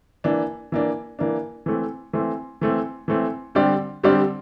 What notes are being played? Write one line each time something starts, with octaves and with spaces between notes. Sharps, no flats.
E3 A#3 D4
E3 A#3 D4
E3 A#3 D4
E3 A3 C4
E3 A3 C4
E3 A3 C4
E3 A3 C4
D3 G3 C4 G4 D5
D3 G3 C4 G4 D5